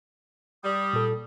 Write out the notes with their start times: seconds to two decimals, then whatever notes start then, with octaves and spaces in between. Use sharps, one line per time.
0.64 G3 D#6
0.93 A#2 A4